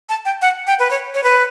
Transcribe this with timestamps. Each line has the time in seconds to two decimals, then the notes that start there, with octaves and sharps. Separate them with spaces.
0.09 A5
0.25 G5
0.42 F#5
0.67 G5
0.79 B4
0.91 C#5
1.14 C#5
1.24 B4